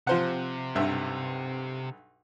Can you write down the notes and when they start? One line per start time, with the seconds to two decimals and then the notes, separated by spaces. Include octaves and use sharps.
0.07 C3 F3 C5 F#5
0.75 B1 G2 E5